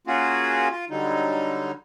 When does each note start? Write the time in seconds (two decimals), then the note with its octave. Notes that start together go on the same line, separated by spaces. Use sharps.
0.07 A#3 C#4 F4 F#4 G#4
0.70 F4
0.90 D3 F#3 G3 D#4